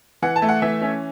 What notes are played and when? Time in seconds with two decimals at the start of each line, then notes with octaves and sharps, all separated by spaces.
0.22 E3 F#5
0.36 A5
0.42 A3
0.49 F#5
0.62 E3 E5
0.82 C#4